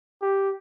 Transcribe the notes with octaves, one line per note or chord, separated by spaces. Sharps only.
G4